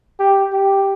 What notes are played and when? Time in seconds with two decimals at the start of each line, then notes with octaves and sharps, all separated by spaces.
0.19 G4
0.53 G4